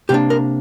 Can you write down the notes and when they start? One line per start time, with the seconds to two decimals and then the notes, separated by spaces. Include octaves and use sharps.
0.09 C3 A#3 D4 G4
0.30 A#4